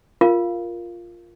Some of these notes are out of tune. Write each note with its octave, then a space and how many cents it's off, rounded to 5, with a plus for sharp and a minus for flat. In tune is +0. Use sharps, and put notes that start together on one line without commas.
F4 +0 A#4 +0 F5 -10